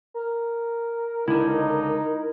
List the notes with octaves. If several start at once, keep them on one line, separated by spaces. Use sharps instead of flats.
A#4
C#2 D3 D#4 E4